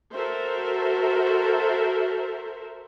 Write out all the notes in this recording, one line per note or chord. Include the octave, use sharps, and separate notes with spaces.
F#4 A4 A#4 C5 E5